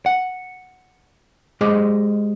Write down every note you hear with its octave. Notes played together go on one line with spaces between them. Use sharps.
F#5
G#3 G4 G#4 C5 D#5